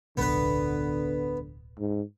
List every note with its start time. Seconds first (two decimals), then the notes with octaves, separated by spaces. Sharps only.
0.17 D1 B1 D3 B3 B4
1.79 G#2